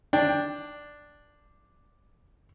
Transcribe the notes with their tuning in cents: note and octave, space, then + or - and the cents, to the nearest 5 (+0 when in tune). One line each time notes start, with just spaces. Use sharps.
D4 +0 G5 +15